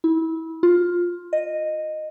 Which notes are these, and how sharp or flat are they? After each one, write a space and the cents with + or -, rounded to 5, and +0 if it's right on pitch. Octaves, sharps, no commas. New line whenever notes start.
E4 -25
F4 +10
D#5 -10